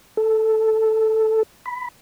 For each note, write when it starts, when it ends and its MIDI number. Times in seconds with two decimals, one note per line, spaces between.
0.17 1.43 69
1.66 1.88 83